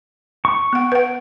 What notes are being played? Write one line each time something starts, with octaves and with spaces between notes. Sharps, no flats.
C#6
B3 F#5
B4 F#5